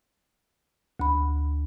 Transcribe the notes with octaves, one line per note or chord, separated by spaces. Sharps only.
D2 B5